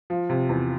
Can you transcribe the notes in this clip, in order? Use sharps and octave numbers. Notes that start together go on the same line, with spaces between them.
F3
C3
E2